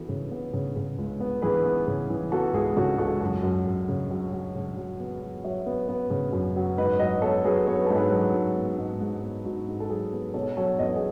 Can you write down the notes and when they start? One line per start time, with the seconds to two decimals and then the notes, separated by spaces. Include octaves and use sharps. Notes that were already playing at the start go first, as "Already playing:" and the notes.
Already playing: E3 B3 F#4 A4
0.09 C#3
0.31 B3
0.53 C#3
0.76 C#3
0.98 C#2
1.20 B3
1.42 E3 G#4 B4
1.65 B3
1.87 C#3
2.10 E3
2.32 B3 F#4 A4
2.54 C#2 G#4
2.76 C#3 F#4 A4
2.98 C#2 F#4 A4
3.20 F#2 F#4 A4
3.43 F#2
3.65 F#2
3.88 C#3
4.10 F#3
4.32 F#3
4.55 C#3
4.77 F#3
5.00 B3
5.22 F#3
5.44 F#3 C#5 E5
5.66 B3
5.88 B3
6.10 C#3
6.33 F#2
6.56 F#3
6.78 G#2 B4 D#5
6.99 F#3 B4 D#5
7.22 B3 A4 C#5
7.45 F#3 G#4 B4
7.67 B3 C#5
7.77 B4
7.86 G#2 A4
7.96 G#4 B4
8.11 F#3
8.34 G#2
8.56 B3
8.78 G#2
9.01 G#2
9.23 B3
9.45 G#2 F#4
9.68 G#2
9.80 A4
9.89 F#3 G#4
10.13 B3
10.34 B2 A4 C#5
10.57 F#3 A4 C#5
10.79 E2 B4 D#5
10.96 G#4